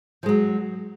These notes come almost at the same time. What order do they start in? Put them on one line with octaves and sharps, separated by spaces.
F3 G#3 F#3